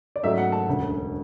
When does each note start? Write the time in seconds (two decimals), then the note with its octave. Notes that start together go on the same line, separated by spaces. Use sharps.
0.16 D5
0.23 G#2 F#3 A3 C#4 E5
0.38 F#5
0.52 A5
0.67 E1 D2 C#3